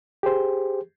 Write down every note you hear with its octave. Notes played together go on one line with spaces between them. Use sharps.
G4 G#4 C5